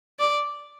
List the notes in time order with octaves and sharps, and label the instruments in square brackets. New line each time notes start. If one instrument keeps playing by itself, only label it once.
[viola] D5